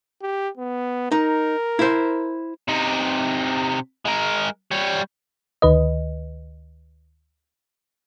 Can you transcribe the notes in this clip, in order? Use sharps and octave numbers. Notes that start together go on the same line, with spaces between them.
G4
B3
D#4 A#4
E4 C5
C3 D#4
G#3 A#4
G3 C#5
D2 D#3 B4 D#5